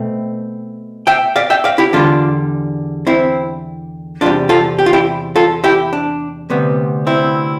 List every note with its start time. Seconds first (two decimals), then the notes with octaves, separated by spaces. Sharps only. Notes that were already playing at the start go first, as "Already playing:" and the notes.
Already playing: B2 A3 C4
1.07 E5 G5
1.36 D5 F5
1.50 E5 G5
1.64 D5 F5
1.78 E4 G4
1.93 E2 D3 G3 D4 F4
3.07 C4 E4
4.21 E2 C3 G3 D4 F4
4.49 F4 A4
4.79 G4
4.86 F4
4.93 E4 G4
5.36 F4 A4
5.64 E4 G4
5.93 D4
6.50 D2 C3 G3 B3
7.07 C4 E4